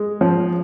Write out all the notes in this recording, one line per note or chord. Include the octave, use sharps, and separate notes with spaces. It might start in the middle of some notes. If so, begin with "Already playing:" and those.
Already playing: G#3
F3